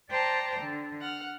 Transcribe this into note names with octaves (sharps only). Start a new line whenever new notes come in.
C5 D5 G5 A5 A#5
D3
F#5 F6